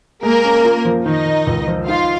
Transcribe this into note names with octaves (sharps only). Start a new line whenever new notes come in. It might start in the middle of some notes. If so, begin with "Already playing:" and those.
G#3 A#3 A#4
C#4
F4
F3
D#3 D#4 D#5
D#3
C#2
F3
D#4 F4 F5